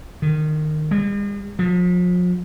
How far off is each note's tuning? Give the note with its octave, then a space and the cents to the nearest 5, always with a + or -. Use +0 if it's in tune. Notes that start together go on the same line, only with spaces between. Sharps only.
D#3 -20
G#3 -45
F3 +40